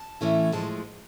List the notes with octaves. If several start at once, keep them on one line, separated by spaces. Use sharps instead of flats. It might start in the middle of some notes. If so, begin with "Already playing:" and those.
Already playing: A5
A2 E3 A3 C#4 E4
A2 F3 G#3 A5